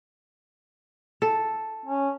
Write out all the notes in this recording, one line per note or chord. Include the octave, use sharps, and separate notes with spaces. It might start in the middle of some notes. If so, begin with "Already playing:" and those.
A4
C#4